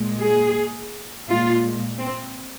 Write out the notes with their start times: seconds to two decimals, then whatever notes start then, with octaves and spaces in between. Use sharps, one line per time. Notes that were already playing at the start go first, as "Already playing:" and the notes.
Already playing: A#2 G#3
0.21 G#4
1.28 A#2 G#3 F4
1.99 C4